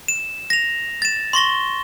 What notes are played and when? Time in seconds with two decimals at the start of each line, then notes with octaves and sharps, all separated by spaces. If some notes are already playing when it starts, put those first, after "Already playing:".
0.08 E7
0.50 A#6 F7
1.02 A6 E7
1.33 C6 C#6 A#6 G7